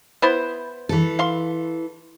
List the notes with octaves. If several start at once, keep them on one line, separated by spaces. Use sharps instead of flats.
B3 E4 C5
E3 A4
F5 C6